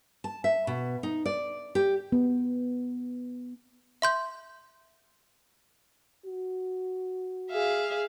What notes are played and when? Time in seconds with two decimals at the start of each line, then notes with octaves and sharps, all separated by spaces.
0.24 A5
0.44 E5
0.67 B2
1.03 D#4
1.26 D5
1.75 G4
2.12 B3
4.02 E5 C6 G6
6.25 F#4
7.51 G#4 E5 F5